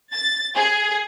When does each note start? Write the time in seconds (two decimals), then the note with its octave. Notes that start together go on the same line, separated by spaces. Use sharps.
0.13 A6
0.56 G#4